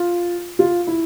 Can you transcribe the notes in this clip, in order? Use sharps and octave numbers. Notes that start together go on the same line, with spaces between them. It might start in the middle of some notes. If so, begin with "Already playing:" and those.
Already playing: F4
F4
E4